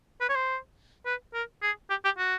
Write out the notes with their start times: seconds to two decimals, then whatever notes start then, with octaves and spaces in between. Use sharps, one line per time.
0.21 B4
0.29 C#5
0.35 C5
1.06 B4
1.34 A#4
1.62 G#4
1.90 G4
2.05 G4
2.18 F#4